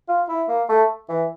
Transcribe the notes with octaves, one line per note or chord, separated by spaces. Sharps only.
F4
E4
A#3
A3
E3